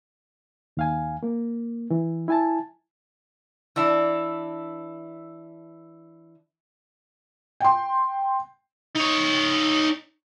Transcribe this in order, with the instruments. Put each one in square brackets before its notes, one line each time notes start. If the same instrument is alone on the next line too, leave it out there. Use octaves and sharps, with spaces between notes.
[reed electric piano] D#2 F5 G#5
A#3
E3
E4 G#5 A5
[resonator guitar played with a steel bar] E3 D4 E4
[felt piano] G5 C6
[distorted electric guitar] D#4 C#5